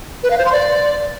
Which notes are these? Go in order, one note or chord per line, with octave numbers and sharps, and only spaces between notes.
B4
F5
C5
C6
D5